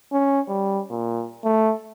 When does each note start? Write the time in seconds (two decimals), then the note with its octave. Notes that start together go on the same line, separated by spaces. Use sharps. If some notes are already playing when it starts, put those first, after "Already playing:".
0.12 C#4
0.48 G3
0.90 A#2
1.44 A3